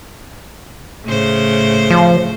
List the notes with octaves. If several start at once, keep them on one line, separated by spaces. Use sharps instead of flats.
A2 C#3 C5
F3